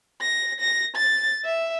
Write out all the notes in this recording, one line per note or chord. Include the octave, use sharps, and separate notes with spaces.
A#6
A#6
A6
E5